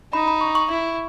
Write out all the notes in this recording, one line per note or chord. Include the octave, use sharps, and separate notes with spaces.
D#4 B5
B5
C#6
C#6
E4